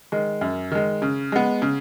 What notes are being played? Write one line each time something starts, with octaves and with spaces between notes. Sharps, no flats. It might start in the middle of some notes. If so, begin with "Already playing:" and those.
D#3 G#3
F#2
D#3 G#3
C#3
G#3 B3
C#3